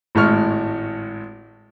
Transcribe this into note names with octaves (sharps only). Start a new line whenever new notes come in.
G#1 A2 G#3 C#6 F6